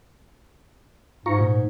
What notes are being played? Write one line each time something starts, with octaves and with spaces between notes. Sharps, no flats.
G#2 F4 A#5 C#6
A#2